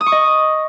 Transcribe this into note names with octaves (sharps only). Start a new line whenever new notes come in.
D#6
C#6
D#5